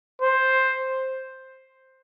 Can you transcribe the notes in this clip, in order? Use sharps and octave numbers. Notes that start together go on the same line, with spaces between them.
C5